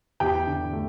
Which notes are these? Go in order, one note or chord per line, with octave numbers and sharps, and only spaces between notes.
E2 G4 G5
D3
A3